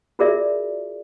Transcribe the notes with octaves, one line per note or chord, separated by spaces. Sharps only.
F4 F#4 G#4 A#4 D5 E5